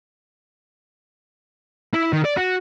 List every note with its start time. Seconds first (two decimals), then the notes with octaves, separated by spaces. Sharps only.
1.93 E4
2.13 D#3
2.25 D5
2.37 F#4